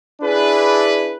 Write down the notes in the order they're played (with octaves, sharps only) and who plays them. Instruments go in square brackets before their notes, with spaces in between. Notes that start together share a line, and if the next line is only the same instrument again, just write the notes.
[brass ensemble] D4 E4 G#4 B4